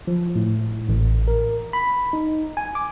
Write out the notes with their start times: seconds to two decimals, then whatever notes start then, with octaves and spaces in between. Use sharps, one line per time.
0.07 F3
0.36 A2
0.89 A1
1.28 A#4
1.73 B5
2.13 D#4
2.57 G#5
2.75 D6